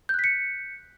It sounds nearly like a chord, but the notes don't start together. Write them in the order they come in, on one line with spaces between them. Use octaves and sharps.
G6 F#6 B6 C#7